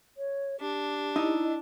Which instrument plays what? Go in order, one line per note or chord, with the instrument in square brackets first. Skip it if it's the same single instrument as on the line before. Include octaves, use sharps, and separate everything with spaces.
[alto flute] C#5
[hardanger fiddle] D4 [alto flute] G4
[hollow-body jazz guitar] D#4 [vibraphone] E4 D#5